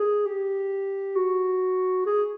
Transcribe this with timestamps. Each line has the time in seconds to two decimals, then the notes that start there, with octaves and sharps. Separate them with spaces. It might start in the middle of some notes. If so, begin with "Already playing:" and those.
Already playing: G#4
0.26 G4
1.16 F#4
2.06 G#4